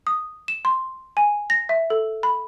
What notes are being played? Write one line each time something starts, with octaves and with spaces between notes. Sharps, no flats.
D#6
E7
C6
G#5
A#6
E5
A4
B5